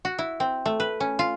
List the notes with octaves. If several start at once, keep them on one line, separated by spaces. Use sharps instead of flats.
F#4
E4
C4
A3
B4
C#4
F4